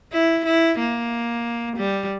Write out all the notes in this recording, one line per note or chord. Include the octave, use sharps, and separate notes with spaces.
E4
E4
A#3
G3